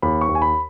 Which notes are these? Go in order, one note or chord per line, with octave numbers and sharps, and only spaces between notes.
D#2 B5
C#6
D#2
G#5
B5